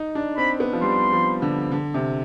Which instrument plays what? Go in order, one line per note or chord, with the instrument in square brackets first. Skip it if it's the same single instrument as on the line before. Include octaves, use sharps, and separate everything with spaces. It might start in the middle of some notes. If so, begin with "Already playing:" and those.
Already playing: [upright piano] D#4
D4
[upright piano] C4 [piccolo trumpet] B5
[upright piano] B3
F3
[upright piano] G3 [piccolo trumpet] C6
[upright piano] F3
D3
D3
C3